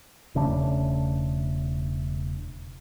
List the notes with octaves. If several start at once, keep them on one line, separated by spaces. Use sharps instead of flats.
E1 C#3 A3 D4